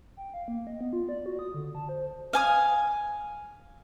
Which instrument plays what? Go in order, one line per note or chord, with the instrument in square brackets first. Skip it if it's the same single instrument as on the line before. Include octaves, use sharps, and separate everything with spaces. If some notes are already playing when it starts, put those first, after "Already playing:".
[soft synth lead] G5
F5
A#3
D#5
B3
F4
D5
F#4
D#6
D3
A5
C5
[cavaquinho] F5 G#5 D#6